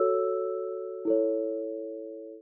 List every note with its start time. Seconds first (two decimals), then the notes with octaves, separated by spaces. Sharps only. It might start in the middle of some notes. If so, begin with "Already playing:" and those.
Already playing: F#4 A4 C#5 E6
1.05 E4 A4 C#5